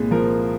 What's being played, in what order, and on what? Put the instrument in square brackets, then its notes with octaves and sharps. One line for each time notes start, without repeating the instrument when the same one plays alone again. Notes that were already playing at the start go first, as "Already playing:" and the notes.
Already playing: [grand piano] C2 A#2 G#3 G#4
F3 A#4